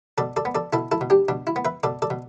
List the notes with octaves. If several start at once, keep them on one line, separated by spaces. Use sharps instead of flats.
B2 A4 D5
A4 D5
B3
A4 D5
B2 E4 A4
E4 A4
B2
D4 G4
B2 D4
E4
B3
B4 E5
B2 A4 D5
A4 D5
B2